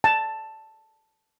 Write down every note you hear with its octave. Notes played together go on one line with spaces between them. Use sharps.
A5